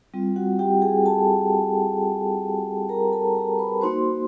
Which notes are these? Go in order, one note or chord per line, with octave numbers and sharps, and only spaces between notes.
G3 C4 F4
F#4 F#5
G4 G5
G#4 G#5
A4 A5
A#4 A#5
A4 A5
A#4 A#5
B4 B5
A#3 D#4 F#4 C5 C6